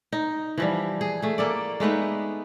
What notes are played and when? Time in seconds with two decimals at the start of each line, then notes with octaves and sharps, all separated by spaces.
0.12 D#4
0.58 E3 F3 G3
1.01 G#4
1.22 A3 G#4
1.38 A#3 A4 D5
1.80 G#3 A3 B3 D#4